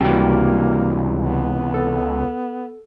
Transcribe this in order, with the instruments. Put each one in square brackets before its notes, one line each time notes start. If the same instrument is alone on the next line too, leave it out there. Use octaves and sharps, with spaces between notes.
[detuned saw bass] C#2 [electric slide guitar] C3 E3 [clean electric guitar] G3 F#4 G5 [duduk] A#3
[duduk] B3
[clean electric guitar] A4